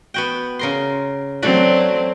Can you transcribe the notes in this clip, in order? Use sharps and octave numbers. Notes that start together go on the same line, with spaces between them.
B3 F#4 G5
C#3 A#4 C6
F#3 A3 C4 D4 F#4